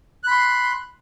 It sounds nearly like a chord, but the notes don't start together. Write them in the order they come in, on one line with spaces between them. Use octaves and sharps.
F#6 B5 C6